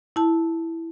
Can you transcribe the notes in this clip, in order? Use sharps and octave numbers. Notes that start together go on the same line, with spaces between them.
E4 A5